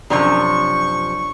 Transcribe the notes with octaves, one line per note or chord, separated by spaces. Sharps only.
F#2 C3 F3 D4 C#6